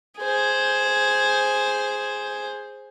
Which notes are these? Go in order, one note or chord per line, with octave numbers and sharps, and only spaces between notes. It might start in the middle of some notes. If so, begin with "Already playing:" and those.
G#4 C5